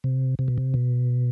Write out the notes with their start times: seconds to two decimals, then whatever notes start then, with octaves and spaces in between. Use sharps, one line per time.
0.04 C3
0.39 C3
0.48 B2
0.58 C3
0.74 B2